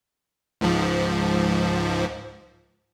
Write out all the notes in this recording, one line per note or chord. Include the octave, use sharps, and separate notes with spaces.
C#2 G#2 F3